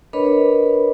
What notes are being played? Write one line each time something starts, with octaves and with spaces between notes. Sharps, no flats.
D4 A#4 B4 C#5 D#5 B5